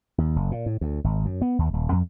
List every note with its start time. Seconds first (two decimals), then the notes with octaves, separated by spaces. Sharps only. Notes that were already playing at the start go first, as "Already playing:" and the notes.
0.18 D#2
0.36 F#1
0.51 A#2
0.66 A2
0.81 D2
1.04 G#1
1.25 F#2
1.41 B3
1.59 D#2
1.74 D#1
1.92 F2